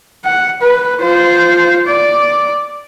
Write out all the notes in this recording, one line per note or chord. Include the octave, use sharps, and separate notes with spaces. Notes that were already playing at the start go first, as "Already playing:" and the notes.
F#5
B4
F4 C5
D5